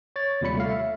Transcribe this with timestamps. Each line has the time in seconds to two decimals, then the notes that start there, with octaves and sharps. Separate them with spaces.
0.16 C#5 A6
0.41 D#2 C3 G3 F4 B5 C#7
0.57 A3 F5
0.70 E5